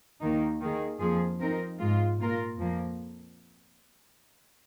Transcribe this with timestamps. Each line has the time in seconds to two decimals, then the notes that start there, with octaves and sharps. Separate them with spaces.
0.21 D#2 D#3 A#3 D#4
0.61 D#3 A#3 G#4
1.00 F2 F3 A#3 G#4
1.39 F3 C4 D#4 A#4
1.80 G#2 G#3 F4
2.19 A#2 A#3 F4 A#4
2.58 F2 F3 A#3